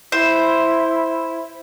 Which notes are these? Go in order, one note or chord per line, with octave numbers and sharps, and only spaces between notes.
E4 C5